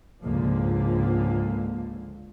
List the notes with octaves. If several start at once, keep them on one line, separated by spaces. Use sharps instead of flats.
C#2 G#2 D3 F3 A#3